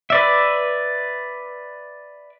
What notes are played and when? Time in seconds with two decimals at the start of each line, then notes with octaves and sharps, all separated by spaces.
0.10 B4 D5 E5